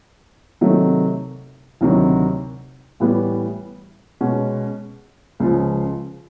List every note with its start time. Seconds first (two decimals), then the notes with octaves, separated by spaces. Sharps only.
0.61 C3 D#3 F#3 A3
1.81 D2 C3 D#3 F#3
3.00 A2 E3 G3 B3
4.21 B2 G#3 C#4
5.40 C#2 C#3 F3